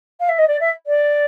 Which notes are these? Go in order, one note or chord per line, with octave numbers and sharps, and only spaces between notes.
F5
E5
D#5
D5
E5
D5